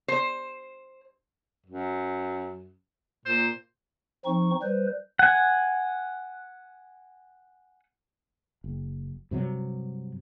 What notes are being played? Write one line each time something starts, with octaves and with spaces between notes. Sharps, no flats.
C5
F#2
A#2 C5
F3 C4 D#4 C#6
G3 B4 C5
F#5 G#5
F#1
G2 C3 F#3